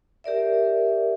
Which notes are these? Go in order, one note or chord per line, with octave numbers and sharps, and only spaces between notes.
G4 A#4 D5 E5